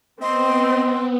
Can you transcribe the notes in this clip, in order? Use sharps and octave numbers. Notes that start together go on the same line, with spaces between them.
B3 C4 D#5 C6